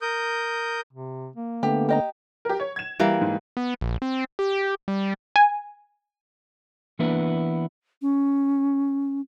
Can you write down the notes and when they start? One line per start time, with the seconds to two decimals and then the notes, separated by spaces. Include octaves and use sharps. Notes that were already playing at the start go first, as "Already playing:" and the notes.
0.02 A#4 D#6 G6
0.93 C3
1.36 A#3
1.63 D3 A3 B3 G4
1.89 G4 D#5 A#5
2.45 G4 A#4
2.60 C#5
2.76 G#6 E7
2.99 E3 G3 A#3
3.21 G#2
3.57 B3
3.81 A#1
4.02 C4
4.39 G4
4.88 G3
5.36 G#5
6.99 E3 A#3 B3 D4 E4 B4
8.02 C#4